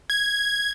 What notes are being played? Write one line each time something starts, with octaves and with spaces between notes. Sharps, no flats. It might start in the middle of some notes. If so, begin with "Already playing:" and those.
G#6